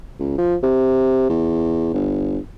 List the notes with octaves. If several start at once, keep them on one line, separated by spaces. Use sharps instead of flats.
C#2
F3
C3
E2
G1